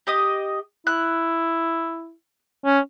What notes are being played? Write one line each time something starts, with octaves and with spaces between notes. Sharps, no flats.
G4 D#5 D#6
E4 F#6
C#4